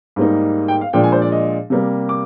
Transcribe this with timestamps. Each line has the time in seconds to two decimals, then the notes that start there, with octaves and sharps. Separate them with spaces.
0.16 G#2 G3 A#3 D#4
0.68 G5
0.81 F5
0.93 A#2 F3 G#3 D4 G5
1.04 G#5
1.12 C5
1.22 D5
1.32 D#5
1.70 C3 G3 A#3
2.09 D6